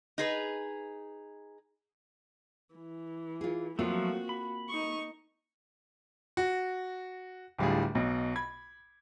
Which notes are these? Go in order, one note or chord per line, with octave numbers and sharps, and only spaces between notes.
D#4 G#4 B4
E3
F4 G#4
F3 F#3 A3 A#3 C4 F4 F#4
B5
D#4 C#6
F#4
D1 A2 G3 D4 F4 G#4
B1 B2
B5 G#6